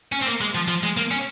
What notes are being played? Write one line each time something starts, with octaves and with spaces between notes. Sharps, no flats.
C#4
C4
A#3
G#3
F3
F3
G#3
A#3
C#4